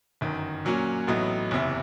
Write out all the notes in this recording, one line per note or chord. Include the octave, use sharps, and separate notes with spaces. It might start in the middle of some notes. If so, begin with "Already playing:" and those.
G1 F#2 D#3
A#2 F#3 A#3 C#4 F#4
A1 A2 F#3 B3 D#4
F#1 E2 C3 E3